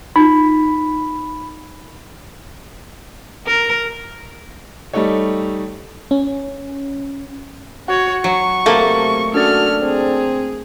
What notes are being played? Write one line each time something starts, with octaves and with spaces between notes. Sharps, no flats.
D#4 F4 B5
A#4
G3 A3 D#4 A4 C#5
C#4
F#4 C#5 F#5
F#3 C#6
C3 A3 A#3
C#4 D4 F#4 A4 D5 F6
C4 G#4